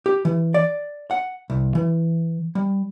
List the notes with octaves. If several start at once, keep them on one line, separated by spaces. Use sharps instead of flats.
G4
E3
D5
F#5
C2
E3
G3